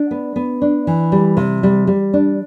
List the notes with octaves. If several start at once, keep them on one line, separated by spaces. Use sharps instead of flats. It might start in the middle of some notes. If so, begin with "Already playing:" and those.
Already playing: D4
B3
B3
D4
E3
G3
C3
G3
G3
D4